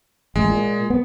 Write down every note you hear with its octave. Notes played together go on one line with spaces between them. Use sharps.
A1 G#3
A#2
B3